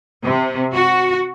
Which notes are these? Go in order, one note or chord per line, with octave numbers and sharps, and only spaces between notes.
C3
F#4